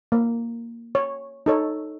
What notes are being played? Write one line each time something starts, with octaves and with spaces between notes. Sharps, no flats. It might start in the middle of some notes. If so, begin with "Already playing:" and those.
A#3
C#5
D#4 A4 C#5